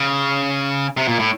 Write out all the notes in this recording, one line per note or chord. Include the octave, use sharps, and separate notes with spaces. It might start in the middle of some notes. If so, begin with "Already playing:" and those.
Already playing: C#3
C3
A#2
A2